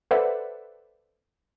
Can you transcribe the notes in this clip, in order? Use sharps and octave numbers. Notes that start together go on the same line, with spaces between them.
A4 B4 C5 D5 E5 F#5